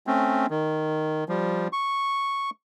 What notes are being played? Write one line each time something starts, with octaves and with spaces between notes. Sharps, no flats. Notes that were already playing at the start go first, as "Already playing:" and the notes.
A3 C4 C#4
D#3
F3 G3
C#6